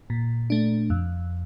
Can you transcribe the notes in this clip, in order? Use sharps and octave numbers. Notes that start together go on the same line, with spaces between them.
A#2
A3 D4
F2